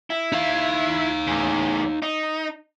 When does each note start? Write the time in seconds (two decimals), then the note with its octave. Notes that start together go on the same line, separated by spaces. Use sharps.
0.10 E4
0.32 D#4 F5
1.27 E2 A2
2.02 D#4